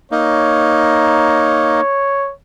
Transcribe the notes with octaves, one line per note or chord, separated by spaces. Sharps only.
A#3 D#4 C#5